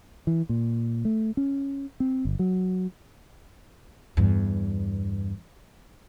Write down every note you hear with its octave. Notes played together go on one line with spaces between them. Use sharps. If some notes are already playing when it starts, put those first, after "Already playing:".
E3
A#2
A3
C#4
C4
G1
F#3
E2 G2